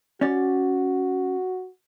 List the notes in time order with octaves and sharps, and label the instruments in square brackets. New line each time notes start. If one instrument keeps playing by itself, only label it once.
[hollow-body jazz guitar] C#4 D5 [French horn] F#4